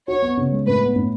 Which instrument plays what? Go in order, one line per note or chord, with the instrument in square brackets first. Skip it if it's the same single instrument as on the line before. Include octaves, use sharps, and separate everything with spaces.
[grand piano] F#4 [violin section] C#5
[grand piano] B3
C#3
G#3
[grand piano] A2 [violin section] B4
[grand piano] B3
A2